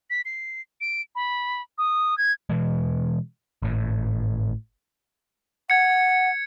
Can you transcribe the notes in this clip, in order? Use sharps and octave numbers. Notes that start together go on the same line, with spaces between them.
B6
C7
D7
B5
D#6
G#6
B2 E3 G#3
G#1 A2
F#5 G#6 C#7